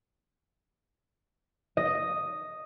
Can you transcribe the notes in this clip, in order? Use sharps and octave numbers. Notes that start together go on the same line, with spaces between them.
D#5